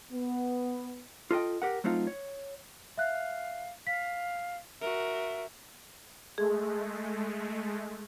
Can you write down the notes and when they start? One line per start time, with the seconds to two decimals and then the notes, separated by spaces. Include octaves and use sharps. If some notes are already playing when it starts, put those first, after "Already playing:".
0.11 B3
1.31 F4 A4 D#5 G5
1.62 G4 A#4 F#5
1.84 F#3 A3 C4 D#4 F4
2.07 C#5
2.97 E5 F5 F#6
3.87 F5 B6
4.81 F#4 A#4 E5
6.38 G#3 A3 G#4